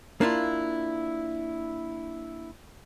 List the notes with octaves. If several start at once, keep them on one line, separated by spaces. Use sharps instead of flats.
A#3 D4 E4 F4